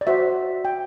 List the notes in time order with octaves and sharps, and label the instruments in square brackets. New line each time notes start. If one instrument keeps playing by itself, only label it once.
[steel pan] D5
F#4 C5 E5
G5